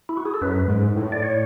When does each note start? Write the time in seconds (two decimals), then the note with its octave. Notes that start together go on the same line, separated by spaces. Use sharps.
0.09 E4
0.17 F#4
0.25 G#4
0.34 A4
0.42 F#2 B4
0.68 G#2
0.96 A2
1.12 D5
1.23 C#5